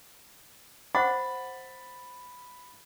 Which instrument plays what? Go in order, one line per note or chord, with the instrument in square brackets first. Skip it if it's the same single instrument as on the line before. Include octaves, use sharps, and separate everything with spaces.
[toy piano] C5 F#5 D6 [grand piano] B5 A6